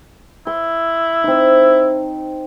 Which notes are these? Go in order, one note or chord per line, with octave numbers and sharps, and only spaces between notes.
E4 C6
C4 D#4